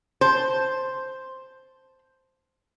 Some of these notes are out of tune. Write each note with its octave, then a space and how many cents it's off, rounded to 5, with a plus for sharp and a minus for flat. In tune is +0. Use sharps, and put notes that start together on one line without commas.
C5 +0 A5 +0